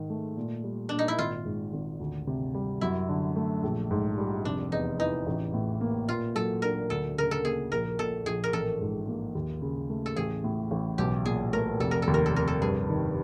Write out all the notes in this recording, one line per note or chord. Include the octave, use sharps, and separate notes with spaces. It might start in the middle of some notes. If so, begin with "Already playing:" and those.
Already playing: G#2 D#3
A3
A#2
G3
A#2 D4
D#4
E4
G#1 F4
G#2
G#1
D2
C3
G3
F#2 E4
D3
A3
A#1
G#2
G3
F1 D4
E2 D#4
E3 D#4
A1
A2
A#3
A#2 F4
F#3 A4
D4 A#4
D2 A4
C#3 A#4
A4
A#3 G#4
A#1 A#4
A#2 A4
A#1 G#4
A#4
A1 A4
G#2
A#3
D#2
C#3
A3
A4
A1 G#4
A2
A1
B1 G4
A#2 G#4
A3 A#4
F1 A4
A#4
A4
D#2
A#4
A4
F1 A#4
A4
G2 G#4
D#3